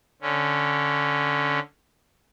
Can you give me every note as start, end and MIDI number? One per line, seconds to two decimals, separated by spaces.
0.22 1.59 50
0.22 1.59 61